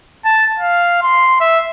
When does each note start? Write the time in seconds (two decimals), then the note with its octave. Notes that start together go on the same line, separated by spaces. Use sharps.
0.25 A5
0.60 F5
1.02 C6
1.41 E5